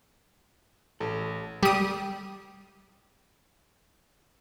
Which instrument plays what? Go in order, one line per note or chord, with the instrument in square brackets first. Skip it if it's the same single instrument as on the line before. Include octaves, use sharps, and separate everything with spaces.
[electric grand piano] A1 [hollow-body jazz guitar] A4
[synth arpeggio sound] G3 D#6